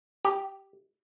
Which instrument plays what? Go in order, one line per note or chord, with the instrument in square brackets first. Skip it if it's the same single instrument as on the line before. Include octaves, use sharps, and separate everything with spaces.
[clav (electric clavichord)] G4